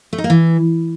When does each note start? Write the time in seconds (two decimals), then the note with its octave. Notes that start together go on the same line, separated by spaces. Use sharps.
0.13 A3
0.18 D#4
0.24 A#3
0.30 E3